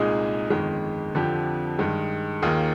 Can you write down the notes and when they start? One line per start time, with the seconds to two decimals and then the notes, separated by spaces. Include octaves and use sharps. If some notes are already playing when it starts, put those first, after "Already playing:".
Already playing: C2 A#2 G#3 D#4 G#4
0.50 G1 F2 D#3 G#3
1.15 F2 D3 F3 C4 G4
1.79 G2 D#3 G#3
2.42 D#2 D#3 A#3 F4 G#4